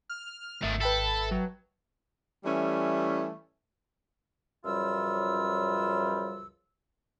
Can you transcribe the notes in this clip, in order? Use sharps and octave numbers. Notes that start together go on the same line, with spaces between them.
F6
G#1 A2 D#3 E5 A6
A4 B4 G5 A5 B5
F#3
E3 G3 A3 C#4
C#2 F#2 F3 G3 F4 E6